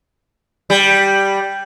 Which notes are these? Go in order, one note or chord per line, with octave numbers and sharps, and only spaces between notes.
G3